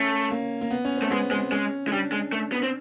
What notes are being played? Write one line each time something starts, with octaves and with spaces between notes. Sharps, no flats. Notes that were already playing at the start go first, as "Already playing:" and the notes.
Already playing: A3 C#4
A#3
A#3
B3
C#4
A3 C4
G#3 B3
G#3 C4
G#3 C#4
G#3
G3 D4
G#3
A3
B3
C4